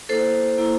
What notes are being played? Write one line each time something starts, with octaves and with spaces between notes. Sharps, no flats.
A#3 E4 A4 C5
A#3 E4